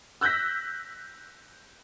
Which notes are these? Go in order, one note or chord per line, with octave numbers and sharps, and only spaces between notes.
E6 F#6 G6 A#6 B6